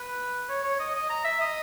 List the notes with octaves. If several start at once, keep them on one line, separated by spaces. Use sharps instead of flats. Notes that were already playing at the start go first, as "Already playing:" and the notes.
Already playing: B4
C#5
C#5
D#5
D#5
A#5
E5
D#5